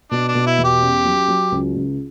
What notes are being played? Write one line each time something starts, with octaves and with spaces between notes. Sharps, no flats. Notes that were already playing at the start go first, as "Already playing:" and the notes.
B2 D4
D4
B2
E4
E2
G4
C#4
F#3
F#3
C#2
C#2